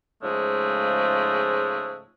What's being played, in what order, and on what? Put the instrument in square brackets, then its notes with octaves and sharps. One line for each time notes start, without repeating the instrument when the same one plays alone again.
[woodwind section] G#2 C#3 F3 G#3 A3